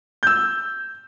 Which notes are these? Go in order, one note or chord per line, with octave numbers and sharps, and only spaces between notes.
E6 G6